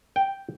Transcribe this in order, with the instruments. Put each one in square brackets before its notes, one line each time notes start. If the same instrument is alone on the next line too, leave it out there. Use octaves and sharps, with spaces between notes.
[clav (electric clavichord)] G5